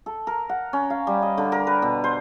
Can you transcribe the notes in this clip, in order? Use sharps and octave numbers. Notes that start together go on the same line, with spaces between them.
A4
A#4
F#5
C#4
F5
G3
D#5
D3
A#4
B4
B2
C5